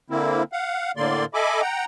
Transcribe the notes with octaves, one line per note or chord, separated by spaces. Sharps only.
D3 A#3 C4 E4
F5 F#5
A2 D3 A#3 D5 C6
A4 D#5 E5 G#5 B5 D6
F#5 G5 A#5